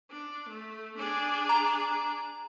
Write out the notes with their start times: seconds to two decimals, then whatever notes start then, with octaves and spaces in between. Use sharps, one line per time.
0.10 D4
0.49 A3
0.98 D4 G#4
1.49 A#5